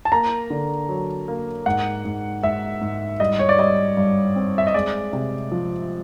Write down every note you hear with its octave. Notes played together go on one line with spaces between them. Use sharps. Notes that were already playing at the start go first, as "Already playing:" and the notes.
A5
A#3 A#5
D3
F#3
A#3
G#2 F#5
G#2
G#2 E5
G#2
G3 D#5
C#5
D5
G3 D#5
G2
C4
E5
D#5
G#3 D5
C3
F3